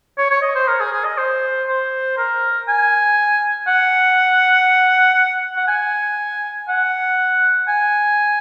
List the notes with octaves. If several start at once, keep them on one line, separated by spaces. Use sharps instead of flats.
C#5
C#5
D#5
C5
A#4
G#4
G#4
D#5
C5
C5
A#4
G#5
F#5
F#5
G#5
F#5
G#5